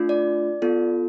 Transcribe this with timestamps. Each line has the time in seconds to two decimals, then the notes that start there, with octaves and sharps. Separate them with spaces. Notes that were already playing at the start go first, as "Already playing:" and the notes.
Already playing: A3 D4 F4
0.09 D5
0.62 B3 F4 A4